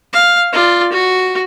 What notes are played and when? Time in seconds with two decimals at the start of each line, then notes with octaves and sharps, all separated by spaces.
0.13 F5
0.53 F4 D5
0.92 F#4